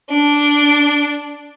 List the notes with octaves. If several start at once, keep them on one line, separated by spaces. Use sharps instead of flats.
D4